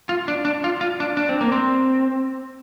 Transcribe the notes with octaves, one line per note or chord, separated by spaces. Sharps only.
F4
D4
D4
F4
F4
D4
D4
C4
A#3
C4